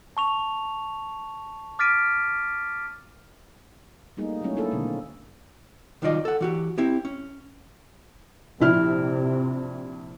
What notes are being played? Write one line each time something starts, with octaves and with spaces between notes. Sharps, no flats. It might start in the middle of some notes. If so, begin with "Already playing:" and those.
A5 C#6 F7
D6 F6 A6 B6 D7 D#7
G3 A3 A#3 D#4 G#4
F#3 G#3 A3 C#4 E4
A#3 D4 E4 G#4 A4
B2 D3 D#3 A3 A#3 C4
C2 D#3 F#3 F4 D5 D#5
A4 F#5
E3 F#4 G4
C4 E4 G4
C#4
A#1 C3 E4 F6